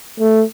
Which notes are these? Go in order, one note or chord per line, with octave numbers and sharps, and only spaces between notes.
A3